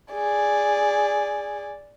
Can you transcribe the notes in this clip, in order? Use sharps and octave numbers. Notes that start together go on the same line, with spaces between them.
G#4 D5